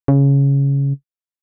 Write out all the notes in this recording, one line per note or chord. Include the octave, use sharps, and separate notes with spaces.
C#3